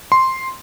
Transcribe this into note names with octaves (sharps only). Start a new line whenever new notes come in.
C6